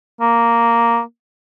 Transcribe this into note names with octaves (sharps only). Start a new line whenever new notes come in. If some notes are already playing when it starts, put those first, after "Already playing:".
A#3